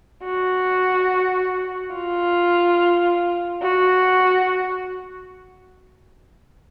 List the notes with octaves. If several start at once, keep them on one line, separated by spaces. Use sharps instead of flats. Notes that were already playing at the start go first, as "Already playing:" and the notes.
F#4
F4
F#4